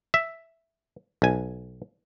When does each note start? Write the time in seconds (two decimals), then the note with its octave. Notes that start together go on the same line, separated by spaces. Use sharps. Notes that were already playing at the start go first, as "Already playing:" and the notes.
0.14 E5
1.22 B1 G#5